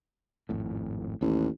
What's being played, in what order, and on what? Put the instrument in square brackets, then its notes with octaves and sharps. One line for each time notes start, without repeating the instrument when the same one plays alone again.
[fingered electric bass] G#1 F2 A2
[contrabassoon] A1 [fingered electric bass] D#2